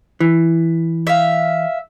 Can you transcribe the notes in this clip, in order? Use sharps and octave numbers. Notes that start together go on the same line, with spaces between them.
E3
E5 F5